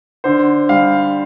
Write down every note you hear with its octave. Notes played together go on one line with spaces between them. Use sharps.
D3 C5
G3 F5